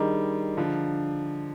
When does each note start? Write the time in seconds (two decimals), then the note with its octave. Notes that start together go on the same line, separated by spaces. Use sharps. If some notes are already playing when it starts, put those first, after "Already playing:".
Already playing: D#3 G3 D4 G#4 D#5 A#5 D6
0.57 D3 F3